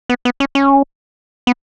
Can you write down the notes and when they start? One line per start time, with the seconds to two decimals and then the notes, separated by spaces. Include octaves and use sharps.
0.09 B3
0.25 B3
0.40 C#4
0.55 C#4
1.47 B3